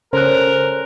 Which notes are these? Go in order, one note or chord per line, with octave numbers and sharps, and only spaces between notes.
C#3 C#4 A4 A#4 C5 F#6